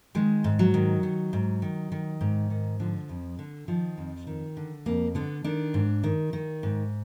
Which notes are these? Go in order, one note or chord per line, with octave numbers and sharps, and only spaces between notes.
D#3 G#3
G#2
F#3
D#3
D#3
G#2
D#3
D#3
G#2
D#3
D3 F3
F2
D3
D#3 F3
F2
D#3
D3
F2 A#3
D3 B3
D#3 D4
G#2
D#3
D#3
G#2